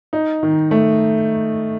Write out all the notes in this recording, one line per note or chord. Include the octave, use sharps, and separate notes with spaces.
D#4
D#3
A3